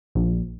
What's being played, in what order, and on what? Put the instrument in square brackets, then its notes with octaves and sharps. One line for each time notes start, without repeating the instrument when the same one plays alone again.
[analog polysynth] A#1